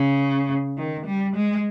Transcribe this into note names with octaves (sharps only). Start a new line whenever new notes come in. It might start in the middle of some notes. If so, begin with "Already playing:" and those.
Already playing: C#3
D#3
G3
G#3